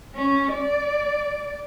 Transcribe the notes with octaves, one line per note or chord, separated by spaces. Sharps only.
C#4
D5